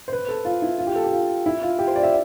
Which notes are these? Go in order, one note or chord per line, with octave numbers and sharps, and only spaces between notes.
C5
B4
A4
F4
E4
F4
G4
A4
G4
F4
E4
F4
G4
C5
D5
E5